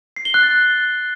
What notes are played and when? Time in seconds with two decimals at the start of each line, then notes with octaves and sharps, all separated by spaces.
0.16 C7
0.25 G7
0.34 F#6
0.43 A6